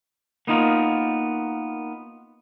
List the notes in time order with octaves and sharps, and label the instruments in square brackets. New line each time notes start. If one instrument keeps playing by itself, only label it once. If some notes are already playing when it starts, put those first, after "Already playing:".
[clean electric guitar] A#3 B3 D#4 F4 A#4